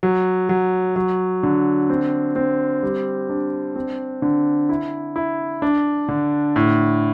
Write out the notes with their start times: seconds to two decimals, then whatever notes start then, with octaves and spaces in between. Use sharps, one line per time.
0.03 F#3
0.49 F#3
0.96 F#3
1.43 D3
1.90 C4
2.36 C4
2.83 G3
3.30 D4
3.76 C4
4.22 D3
4.69 E4
5.16 E4
5.62 D4
6.09 D3
6.56 A2